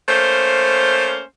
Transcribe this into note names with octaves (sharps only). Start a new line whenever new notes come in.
A3 A#3 C#4 C5